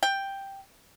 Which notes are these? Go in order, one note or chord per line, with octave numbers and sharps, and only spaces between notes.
G5